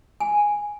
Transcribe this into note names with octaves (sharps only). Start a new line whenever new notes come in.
G#5